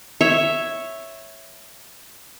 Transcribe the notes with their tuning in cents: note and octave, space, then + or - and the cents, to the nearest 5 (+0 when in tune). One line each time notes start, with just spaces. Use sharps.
C#5 -5 E5 +0